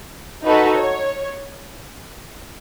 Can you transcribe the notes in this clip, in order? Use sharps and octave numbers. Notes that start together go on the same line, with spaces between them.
D#4 F#4 A4 B4
C#5